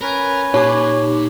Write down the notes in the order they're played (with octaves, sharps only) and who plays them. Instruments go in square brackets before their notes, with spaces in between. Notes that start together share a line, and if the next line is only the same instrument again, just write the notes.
[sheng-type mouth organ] C#4 B4 [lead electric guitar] A#4
[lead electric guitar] A#2 [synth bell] D#4 G4 D6 [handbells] C#5